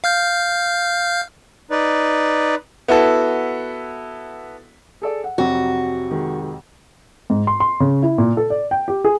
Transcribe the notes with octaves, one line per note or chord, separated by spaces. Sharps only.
F5 F6 G6
D#4 B4 D5
B3 E4 F#4 A4
G#4 A4 D5
F#5
F2 C3 F#3 F#4
D#3 G#3
G#2
C6
C6
C#3
E4
A#2
A4
D5
G5
G4
G#4